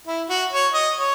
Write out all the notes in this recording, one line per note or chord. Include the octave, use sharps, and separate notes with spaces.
E4
F#4
C#5
D#5
C#5